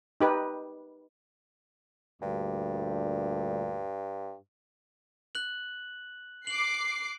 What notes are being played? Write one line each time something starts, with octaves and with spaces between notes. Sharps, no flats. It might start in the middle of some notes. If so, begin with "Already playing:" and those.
D#4 G4 B4
D2 G2 A#2 G3
F#6 F#7
D6 C7 F#7